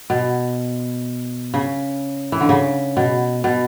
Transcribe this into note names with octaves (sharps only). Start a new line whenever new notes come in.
B2
C#3
E3
D3
C#3
B2
B2